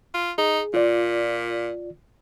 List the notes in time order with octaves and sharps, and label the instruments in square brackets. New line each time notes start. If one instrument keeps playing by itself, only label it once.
[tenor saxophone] F4
[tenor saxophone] D#4 [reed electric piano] G#4
[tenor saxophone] A#2 [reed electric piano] F4 D5